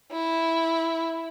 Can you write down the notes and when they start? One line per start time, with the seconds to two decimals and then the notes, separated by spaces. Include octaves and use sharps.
0.12 E4